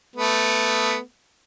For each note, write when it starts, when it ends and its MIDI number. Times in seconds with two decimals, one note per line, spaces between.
0.16 0.98 57
0.16 0.98 59